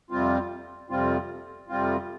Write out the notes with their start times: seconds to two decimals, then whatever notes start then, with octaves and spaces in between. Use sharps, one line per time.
0.11 F2 C3 G3 C4 F4
0.90 F2 C3 G3 C4 F4
1.69 F2 C3 G3 C4 F4